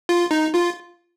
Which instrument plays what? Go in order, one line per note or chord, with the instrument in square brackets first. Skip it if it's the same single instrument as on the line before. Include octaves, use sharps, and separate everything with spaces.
[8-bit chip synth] F4
D#4
F4